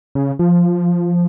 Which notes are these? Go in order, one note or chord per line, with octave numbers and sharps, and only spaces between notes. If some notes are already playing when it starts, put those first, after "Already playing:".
C#3
F3